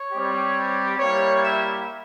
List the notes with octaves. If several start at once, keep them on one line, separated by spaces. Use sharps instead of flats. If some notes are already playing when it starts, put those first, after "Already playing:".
Already playing: C#5
G3 C4 G4
G3 A#3 E4 G4 C#5
E5